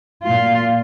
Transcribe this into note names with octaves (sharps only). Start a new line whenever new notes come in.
A#2 F4